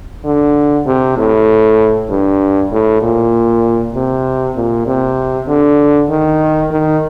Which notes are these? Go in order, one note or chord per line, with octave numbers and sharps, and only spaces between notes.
D3
C3
A2
G2
A2
A#2
C3
A#2
C3
D3
D#3
D#3